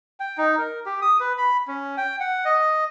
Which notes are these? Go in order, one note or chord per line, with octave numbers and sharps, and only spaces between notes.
G5
D#4
A#4
G4
D#6
B4
B5
C#4
G5
F#5
D#5